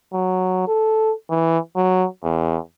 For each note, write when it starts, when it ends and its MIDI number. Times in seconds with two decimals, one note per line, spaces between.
0.13 0.67 54
0.68 1.13 69
1.30 1.58 52
1.76 2.07 54
2.23 2.58 40